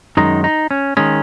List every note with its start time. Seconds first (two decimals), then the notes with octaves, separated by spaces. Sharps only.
0.17 F#2 D#3 G#3 D#4
0.44 D#4
0.71 C#4
0.97 D#3 G#3 C#4